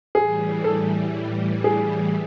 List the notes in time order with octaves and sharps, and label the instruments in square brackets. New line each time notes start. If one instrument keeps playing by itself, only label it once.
[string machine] A2 E3 G3 [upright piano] G#4
[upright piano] A4
G#4